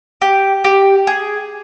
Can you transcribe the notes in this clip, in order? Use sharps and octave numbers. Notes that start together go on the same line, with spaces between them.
G4
G4
G#4